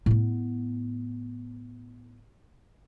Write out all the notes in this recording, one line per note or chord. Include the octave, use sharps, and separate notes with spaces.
A2 B3